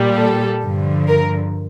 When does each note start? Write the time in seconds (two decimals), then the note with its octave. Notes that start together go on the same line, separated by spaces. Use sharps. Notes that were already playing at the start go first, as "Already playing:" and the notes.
Already playing: A#2 G3
0.18 A4
0.63 G2 D3 F3
1.08 A#4